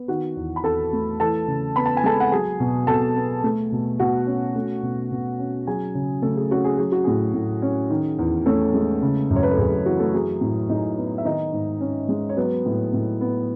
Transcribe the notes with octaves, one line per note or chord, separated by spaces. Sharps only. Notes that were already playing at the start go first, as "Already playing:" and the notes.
Already playing: B3
D#3 F#4 F#5
E2
B5
E2 A4 A5
A3
E3 A4 A5
C#3
B3 B5
A5
G#5
G#3 A4 A5
F#5
F#3 G#4 G#5
B2
B2 A4 A5
B3
A3
B2
B2 F#4 F#5
C#4
A3
B2
B2
C#4
F#3 G#4 G#5
C#3
C#3 A3 A4
G#4
C#4 F#4
G#4
F#3 G#4
F#4
A2 G#4
A2
C#4
D#3
E2
A3 C#4 A4
G#3
C#3
F#2
C#5
B4
A4
F#2 G#4
G#4
E3 F#4
A3 A4
F#3 G#4
A2
A2 D#4 D#5
B3
E5
D#3 D#4 D#5
G#2
C#4
G#3
C#5
F#3 B3 B4
A2
A2
B3